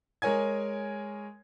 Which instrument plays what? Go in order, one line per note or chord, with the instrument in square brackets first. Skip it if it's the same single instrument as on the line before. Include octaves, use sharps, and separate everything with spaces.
[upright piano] G#3 A#4 C#5 G#5 G#6